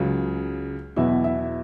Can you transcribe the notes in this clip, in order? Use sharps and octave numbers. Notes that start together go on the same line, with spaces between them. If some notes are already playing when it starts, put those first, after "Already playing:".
Already playing: C#2 C#3 F#3
E2 B2 F#3 E4 E5
E4 E5